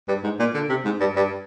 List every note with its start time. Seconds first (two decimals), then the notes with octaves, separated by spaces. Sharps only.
0.08 G2
0.24 G#2
0.40 A#2
0.54 D3
0.70 C3
0.85 G#2
1.00 G2
1.16 G2